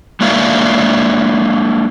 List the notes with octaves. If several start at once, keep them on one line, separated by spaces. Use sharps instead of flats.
G#3 A#3 D4 F4 E5 F5